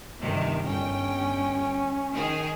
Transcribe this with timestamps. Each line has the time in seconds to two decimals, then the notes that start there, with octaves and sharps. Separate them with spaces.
0.20 G1 C3 D#3
0.65 G1 C#4 G5
2.13 D#3 G#4